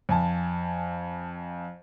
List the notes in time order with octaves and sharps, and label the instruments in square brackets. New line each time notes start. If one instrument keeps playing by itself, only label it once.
[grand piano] F2 G#5 A5